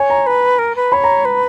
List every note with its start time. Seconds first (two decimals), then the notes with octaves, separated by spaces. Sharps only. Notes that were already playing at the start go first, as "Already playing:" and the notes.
Already playing: C#5 G#5
0.10 A#5
0.27 B4
0.59 A#4
0.76 B4
0.92 C#5 B5
1.04 A#5
1.25 B4